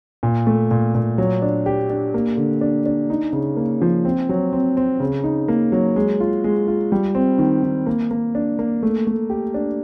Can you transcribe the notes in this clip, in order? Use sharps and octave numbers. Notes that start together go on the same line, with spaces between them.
A#2
A3
A#2
A#2
F#3
D4
G4
D4
A#3
D3
D4
D4
D#4
C#3
A#3
F3
C4
F#3
C4
C4
C#3
D#4
A#3
F#3
G#3
F4
G#3
F4
G3
C4
D#3
D#3
A#3
A#3
D4
A#3
A3
A3
G4
D4